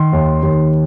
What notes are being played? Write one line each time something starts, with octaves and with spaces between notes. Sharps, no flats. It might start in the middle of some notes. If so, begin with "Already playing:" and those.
Already playing: D#3 C6
D#2
D#2